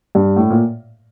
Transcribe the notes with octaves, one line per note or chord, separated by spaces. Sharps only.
G2
A2
A#2